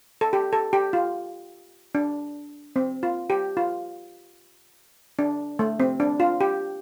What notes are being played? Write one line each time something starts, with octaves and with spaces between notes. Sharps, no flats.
A4
G4
A4
G4
F4
D4
C4
F4
G4
F4
D4
A3
C4
D4
F4
G4